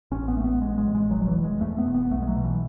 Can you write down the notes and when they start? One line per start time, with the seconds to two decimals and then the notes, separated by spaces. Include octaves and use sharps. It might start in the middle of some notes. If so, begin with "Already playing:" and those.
0.11 A1 C#4
0.28 B3
0.37 A1 A3
0.44 B3
0.62 A1 G#3
0.78 G#3
0.86 A1
0.95 G#3
1.11 E1 F#3
1.22 F#3
1.28 E3
1.36 E1
1.44 G#3
1.61 E2 A3
1.78 B3
1.86 E1
1.94 B3
2.11 B1 A3
2.22 G#3
2.27 F#3
2.36 B2
2.44 E3